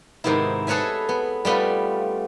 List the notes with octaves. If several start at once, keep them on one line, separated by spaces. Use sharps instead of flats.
G#2 C3 D#3 B3 E4
G#4 A4 B4 C#5 E5 G#5
B3
G3 A3 B3 C#4 F4